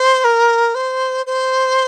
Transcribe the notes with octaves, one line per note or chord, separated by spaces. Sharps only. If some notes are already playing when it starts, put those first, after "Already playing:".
Already playing: C5
A#4
C5
C5